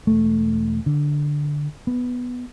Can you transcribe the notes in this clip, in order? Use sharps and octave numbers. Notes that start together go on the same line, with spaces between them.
E1 A3
D3
B3